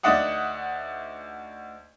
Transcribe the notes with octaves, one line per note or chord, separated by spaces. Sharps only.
D2 D#4 D5 E5 F#5 D#6